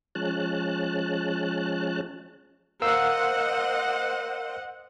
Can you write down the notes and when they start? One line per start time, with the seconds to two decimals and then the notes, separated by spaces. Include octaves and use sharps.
0.15 F3 G#3 C#4 A5 F#6
2.82 A#4 C5 D#5 F5 F#5 E6